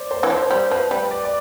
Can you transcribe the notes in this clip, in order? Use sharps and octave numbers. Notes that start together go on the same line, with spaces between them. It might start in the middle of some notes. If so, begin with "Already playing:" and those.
Already playing: C5 D5
C5
E3
F3 C5
G3 C5
F3 B4
G3 B4
D5
D5